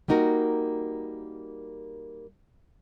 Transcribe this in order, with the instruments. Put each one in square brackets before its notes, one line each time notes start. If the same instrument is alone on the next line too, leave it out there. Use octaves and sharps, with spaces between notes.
[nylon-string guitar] G3 A#3 D#4 F#4 A#4